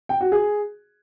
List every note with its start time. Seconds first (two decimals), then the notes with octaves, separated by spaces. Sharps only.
0.09 G5
0.21 F#4
0.32 G#4